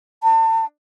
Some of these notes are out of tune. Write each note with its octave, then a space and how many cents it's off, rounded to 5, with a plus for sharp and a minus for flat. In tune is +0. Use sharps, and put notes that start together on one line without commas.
A5 +40